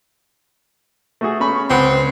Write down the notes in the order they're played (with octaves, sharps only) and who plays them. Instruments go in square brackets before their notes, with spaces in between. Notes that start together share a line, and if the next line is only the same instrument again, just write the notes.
[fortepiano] A3 F#4 G#4
C#4 B5 C#6
[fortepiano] C#2 F#5 B5 [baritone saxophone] C4